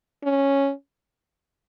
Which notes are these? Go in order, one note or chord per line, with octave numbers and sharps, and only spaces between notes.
C#4